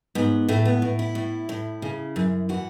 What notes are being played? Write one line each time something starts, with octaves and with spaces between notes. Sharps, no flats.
G#2 B3
A2 A3
B3
A2
E4
A2
A2
C#3
F#2
E3 F#4